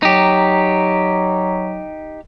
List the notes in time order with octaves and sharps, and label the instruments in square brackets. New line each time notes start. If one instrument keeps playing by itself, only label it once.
[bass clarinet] F#3 [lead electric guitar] D#4 G4